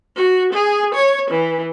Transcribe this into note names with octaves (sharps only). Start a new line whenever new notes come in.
F#4
G#4
C#5
E3